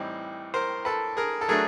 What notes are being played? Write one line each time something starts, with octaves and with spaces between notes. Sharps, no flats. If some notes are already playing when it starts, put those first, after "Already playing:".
Already playing: A2 E3 G3 C4 D#4
A#4 C5
A4 B4
G#4 A#4
A4
F#3 A3 D4 G#4 A#4